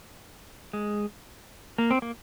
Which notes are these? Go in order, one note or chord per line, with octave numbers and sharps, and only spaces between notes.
G#3
A#3
C4
A#3